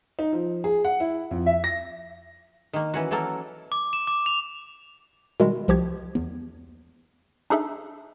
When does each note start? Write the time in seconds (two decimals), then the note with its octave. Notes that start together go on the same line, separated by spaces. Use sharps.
0.19 D#4
0.33 F3
0.64 G#4
0.85 F#5
1.00 E4
1.31 F2
1.46 E5
1.64 A#6
2.73 D#3 A#3
2.94 E3 C#4 F#4
3.11 E3 F#3 A#3 A4 A#4
3.72 D6
3.93 E7
4.07 D6
4.26 F7
5.40 B2 D#3 G3 G#3
5.68 C2 F3 G4 G#6
6.15 E2
7.50 D4 D#4 G#4 A4 E5